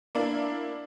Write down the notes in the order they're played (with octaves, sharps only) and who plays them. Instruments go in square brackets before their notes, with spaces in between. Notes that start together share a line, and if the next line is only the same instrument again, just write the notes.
[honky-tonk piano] A#3 D4 E4